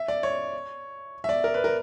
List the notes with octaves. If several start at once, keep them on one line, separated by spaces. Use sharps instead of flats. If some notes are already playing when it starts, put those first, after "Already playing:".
Already playing: E5
D5
C#5
E5
D5
A#4
B4
A#4